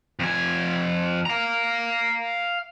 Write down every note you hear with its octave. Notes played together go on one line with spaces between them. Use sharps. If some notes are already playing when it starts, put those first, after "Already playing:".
F2 G#5
F5 A#5